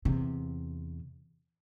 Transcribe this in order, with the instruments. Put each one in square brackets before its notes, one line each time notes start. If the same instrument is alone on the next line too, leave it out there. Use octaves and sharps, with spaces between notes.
[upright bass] E2 C3